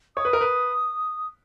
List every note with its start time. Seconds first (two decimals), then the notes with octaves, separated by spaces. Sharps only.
0.16 C#5 D#6
0.25 B4
0.33 A#4
0.41 B4